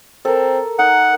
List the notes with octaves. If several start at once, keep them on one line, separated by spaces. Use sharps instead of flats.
C4 A4 A#4
D#4 A#4 F#5